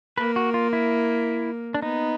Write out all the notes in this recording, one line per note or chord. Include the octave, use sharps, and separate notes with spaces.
A#3 B4
F#4
F4
E4
D4
B3 D#4